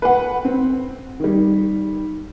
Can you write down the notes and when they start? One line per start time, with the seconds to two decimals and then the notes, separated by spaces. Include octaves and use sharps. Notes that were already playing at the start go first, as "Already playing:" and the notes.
0.02 B4 F#5
0.45 C4
1.20 D#3 G3